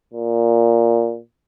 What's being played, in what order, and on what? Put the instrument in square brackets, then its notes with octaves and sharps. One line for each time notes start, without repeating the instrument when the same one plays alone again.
[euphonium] A#2